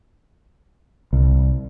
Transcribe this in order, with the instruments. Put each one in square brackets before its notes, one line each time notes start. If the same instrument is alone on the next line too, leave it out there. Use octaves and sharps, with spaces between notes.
[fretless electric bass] C2